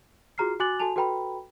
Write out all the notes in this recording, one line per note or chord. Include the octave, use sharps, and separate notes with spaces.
F4 F#4 G#4 A#5 F6 C7
F#4 G#5 D6 F#6 A6 F#7
F#4 A4 G#5 A5 F7
F#4 A4 B4 G5 A#5 B5